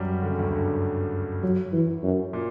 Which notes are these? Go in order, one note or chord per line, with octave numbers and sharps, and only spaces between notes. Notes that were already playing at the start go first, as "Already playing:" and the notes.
Already playing: F#2 F#3 G3
D3
C#3
D2 D3
G2
F#3
E3
F#2
A#2